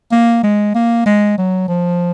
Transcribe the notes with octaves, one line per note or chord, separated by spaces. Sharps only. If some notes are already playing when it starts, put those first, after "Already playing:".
A#3
G#3
A#3
G#3
F#3
F3